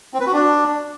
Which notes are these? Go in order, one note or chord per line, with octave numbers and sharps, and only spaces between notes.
C4
B4
F#4
D4